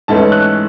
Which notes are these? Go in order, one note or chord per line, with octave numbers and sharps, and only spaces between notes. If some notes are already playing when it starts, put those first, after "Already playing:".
G#2 E3 A3 C#4 E4 A5
F#6